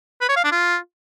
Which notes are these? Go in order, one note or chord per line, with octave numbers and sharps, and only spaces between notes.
B4
C#5
F5
D4
F4